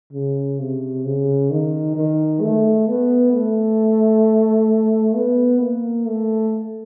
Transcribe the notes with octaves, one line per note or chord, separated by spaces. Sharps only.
C#3
C3
C#3
D#3
D#3
A3
B3
A3
B3
A#3
A3